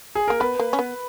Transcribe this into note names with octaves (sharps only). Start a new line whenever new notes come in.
G#4
A#3 A#4
B3 B4
A#3
C#4
B3